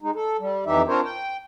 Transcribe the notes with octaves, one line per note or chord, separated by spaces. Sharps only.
G#3 D#4
A4
G3
F2 E3 D#4 G4 E5
C4 D4 F4 A#4 C5 C#5
G5